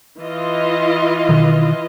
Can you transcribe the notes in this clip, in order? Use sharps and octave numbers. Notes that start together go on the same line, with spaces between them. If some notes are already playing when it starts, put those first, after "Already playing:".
E3 F4 D#5
B2 D#3